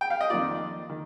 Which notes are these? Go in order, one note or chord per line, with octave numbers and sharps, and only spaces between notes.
G5
F5
D#5
F2 D#3 A#3 F4 D5
D#3